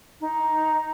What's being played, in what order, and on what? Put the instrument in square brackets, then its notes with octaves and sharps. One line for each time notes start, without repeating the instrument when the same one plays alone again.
[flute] D#4